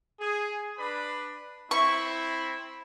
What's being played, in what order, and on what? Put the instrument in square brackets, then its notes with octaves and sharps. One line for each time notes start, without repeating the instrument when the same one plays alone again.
[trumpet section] G#4
D4 B4 B5
[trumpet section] C4 E4 [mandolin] C#6